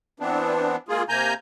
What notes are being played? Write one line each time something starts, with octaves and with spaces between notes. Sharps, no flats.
E3 B3 C4 D4
G#3 A#3 F4 G#4
C3 A#3 G#5 A#5 G6